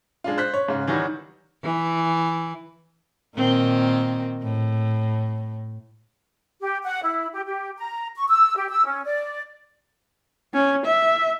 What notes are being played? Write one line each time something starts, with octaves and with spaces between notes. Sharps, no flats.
G#3 D4 F4
C5 F#6 B6
C#5
G#2 C#3
D#3 E3 F#3 G3 D#4 F#4
E3
A#2 D#3 C4
A2
G4
F#5
E4
G4
G4
A#5
C#6
E6
G4
E6
C#4
D5
C#4
E5